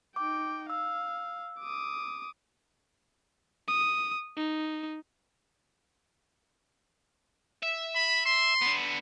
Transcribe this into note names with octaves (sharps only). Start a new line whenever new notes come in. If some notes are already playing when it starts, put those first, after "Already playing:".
D#4 G5 D6
F5 E6
D6 D#6
D#6
D#4
E5
B5
C6
D3 B3